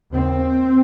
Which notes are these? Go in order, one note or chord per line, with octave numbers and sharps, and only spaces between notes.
D#2 C#3 C4